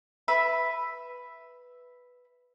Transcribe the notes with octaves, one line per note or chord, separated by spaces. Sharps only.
B4 E5 B5